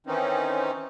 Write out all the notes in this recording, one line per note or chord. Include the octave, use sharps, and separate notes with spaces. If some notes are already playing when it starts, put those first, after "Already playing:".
D#3 E3 C4 C#4 D#4